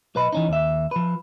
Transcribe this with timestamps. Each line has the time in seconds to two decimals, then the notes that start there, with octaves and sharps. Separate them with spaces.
0.15 B1 B4 D#5 B5
0.33 E3 C#4 D#4
0.49 D#2 E5
0.91 F3 B4